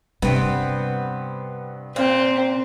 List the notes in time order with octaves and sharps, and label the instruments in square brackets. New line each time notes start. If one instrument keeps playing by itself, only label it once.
[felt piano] G2 [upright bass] C3 [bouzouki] B3 C4
[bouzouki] A#2 [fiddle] C4